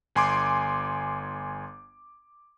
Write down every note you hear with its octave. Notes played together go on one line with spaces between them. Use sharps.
G1 G#5 C6 D6